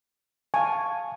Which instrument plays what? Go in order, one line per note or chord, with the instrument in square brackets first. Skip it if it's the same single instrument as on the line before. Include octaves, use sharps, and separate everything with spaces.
[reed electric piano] F5 A5 C#6 [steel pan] G#5